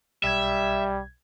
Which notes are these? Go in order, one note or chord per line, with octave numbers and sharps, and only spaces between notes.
B1 G3 E5 G#6